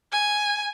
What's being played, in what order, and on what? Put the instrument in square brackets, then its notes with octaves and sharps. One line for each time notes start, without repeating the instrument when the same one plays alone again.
[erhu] G#5